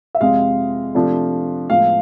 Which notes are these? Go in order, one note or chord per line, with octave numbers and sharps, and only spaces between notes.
E5
F2 C3 G#3 C4 F5
C3 F3 A3 D4
A2 F3 G#3 B3 F5